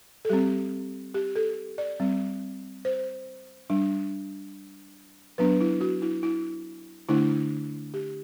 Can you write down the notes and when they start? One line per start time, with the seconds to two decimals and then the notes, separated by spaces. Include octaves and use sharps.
0.25 A4
0.29 G3 C4 G4
1.14 G4
1.36 A4
1.78 D5
2.00 G3 C4
2.85 C5
3.70 G3 D4
5.38 F#3 B3 D4 B4
5.61 E4
5.81 F#4
6.02 E4
6.23 E4
7.09 D3 A3 D4 E4
7.94 G4